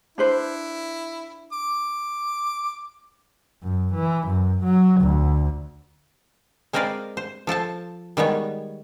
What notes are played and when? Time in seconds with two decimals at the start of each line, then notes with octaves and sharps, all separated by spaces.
0.18 D4 E4 B4 C5
1.53 D6
3.63 F#2
3.94 E3
4.27 F#2
4.64 F#3
5.00 D2
6.73 G#3 C4 A#4 B4 D5 F5
7.17 C5
7.47 F3 A4 C5 A5
8.17 D#3 G3 G#3 B3 C#5